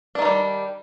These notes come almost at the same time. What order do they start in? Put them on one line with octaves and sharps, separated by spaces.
D4 D#3 A#3 G3